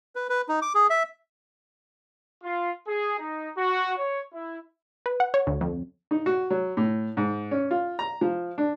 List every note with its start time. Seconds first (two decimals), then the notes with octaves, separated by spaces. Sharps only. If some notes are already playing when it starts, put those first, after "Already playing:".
0.16 B4
0.29 B4
0.49 D#4
0.62 D6
0.75 G#4
0.90 E5
2.43 F4
2.86 G#4
3.17 D#4
3.55 F#4
3.97 C#5
4.32 E4
5.06 B4
5.20 F#5
5.34 C#5
5.47 D2
5.61 F2
6.11 D#4
6.26 F#4
6.50 F#3
6.77 A2
7.17 G#2
7.51 C#4
7.71 F4
7.99 A#5
8.21 F3
8.58 D4